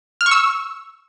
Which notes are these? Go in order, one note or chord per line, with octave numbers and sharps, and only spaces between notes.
F6
C#6
E6